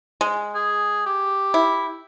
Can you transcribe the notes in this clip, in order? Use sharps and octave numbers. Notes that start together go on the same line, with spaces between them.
G#3
G#4
G4
E4